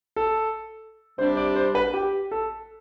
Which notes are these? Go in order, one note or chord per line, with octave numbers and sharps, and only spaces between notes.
A4
C3 G3 D4 G4 C5
D5
C5
B4
G4
A4